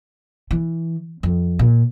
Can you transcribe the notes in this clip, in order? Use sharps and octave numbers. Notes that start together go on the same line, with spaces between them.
E3
F2
A#2